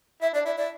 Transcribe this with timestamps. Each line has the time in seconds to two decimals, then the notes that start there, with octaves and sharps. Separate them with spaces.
0.22 E4 E5
0.33 D4 D5
0.45 E4 D5
0.57 E4 D5